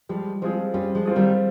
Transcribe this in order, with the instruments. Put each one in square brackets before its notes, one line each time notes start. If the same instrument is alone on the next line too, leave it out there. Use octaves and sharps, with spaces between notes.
[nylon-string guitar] F3 G#3 [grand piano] G3
[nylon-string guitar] F3 G#3 [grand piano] C4 F4 G#4
[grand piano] G3 [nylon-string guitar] C#4 F4
[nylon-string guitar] F3 G#3
[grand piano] C4 F4 G#4
[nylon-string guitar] D#3 G3